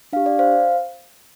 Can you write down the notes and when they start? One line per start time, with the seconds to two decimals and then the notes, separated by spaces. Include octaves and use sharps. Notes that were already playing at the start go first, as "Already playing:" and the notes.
0.13 D4 G4 F5
0.26 D5
0.39 C5 F5